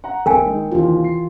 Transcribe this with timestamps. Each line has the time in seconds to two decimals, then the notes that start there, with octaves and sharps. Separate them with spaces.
0.04 F#5 A#5
0.26 A#1 A#4 G5 G#5
0.44 D#3 G#3 D#4
0.72 D#2 C3 D#3 E3 F4
1.04 C7